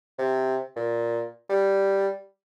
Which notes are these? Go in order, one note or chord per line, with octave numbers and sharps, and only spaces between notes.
C3
A#2
G3